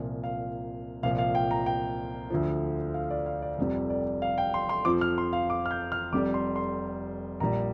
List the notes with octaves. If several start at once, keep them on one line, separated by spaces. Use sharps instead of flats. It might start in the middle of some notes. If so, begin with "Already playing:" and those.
Already playing: C2 A#2 F3
F5
C2 A#2 F3 F5
F5
G5
A#5
G5
D2 D3 F3
F5
D5
F5
D5
F1 F2 C3 G3
D5
F5
G5
C6
C6
F2 F3 D6
F6
C6
F5
D6
F6
G6
F6
F1 F2 C3 G3 D6
C6
C6
A#1 A#2 G3 A#5